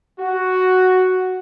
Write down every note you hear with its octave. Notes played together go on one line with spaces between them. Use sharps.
F#4